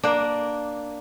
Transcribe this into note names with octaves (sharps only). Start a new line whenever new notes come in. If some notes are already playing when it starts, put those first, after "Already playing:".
A#3 D4